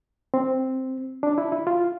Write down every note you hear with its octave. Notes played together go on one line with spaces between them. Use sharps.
C4
D4
E4
E4
F4